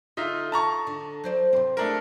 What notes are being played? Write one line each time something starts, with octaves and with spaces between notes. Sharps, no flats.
D3 D#4 F4 E5
A5 A#5 C#6
D3
F#3 C5 D5
C3 C4
G#3 A3 D4 E4 F4 A#4